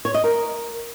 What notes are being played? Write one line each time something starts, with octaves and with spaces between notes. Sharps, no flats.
C#5
D#5
A#4